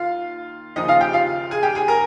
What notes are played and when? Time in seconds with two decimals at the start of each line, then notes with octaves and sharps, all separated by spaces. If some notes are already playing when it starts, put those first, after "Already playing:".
Already playing: D#2 F4 F5
0.76 D#2 C#3 F3 D#4 D#5
0.88 F4 F5
1.01 G4 G5
1.13 F4 F5
1.51 G#4 G#5
1.63 G4 G5
1.75 G#4 G#5
1.88 A#4 A#5